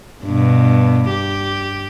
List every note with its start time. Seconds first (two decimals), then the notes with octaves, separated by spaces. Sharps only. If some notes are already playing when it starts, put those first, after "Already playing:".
0.25 G2 B2
1.10 G4